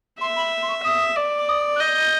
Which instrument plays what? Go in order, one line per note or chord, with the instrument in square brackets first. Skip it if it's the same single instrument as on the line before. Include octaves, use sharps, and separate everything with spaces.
[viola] E5 [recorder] C6
[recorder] B5
C6
C#6
[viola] E5 [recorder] D#6
[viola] D5
[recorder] D6
D#6
F#6
[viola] D#5 [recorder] G6